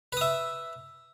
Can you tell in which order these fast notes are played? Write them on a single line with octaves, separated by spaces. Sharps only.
B4 D#6 E5